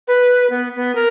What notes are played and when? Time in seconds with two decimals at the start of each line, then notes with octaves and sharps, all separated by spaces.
0.08 B4
0.50 B3
0.76 B3
0.95 A#4